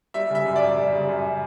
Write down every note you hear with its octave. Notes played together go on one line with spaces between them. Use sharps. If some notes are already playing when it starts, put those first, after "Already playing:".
G3 E5
C#3 E5
F#2
D5
F#2
G3
C#3
F#2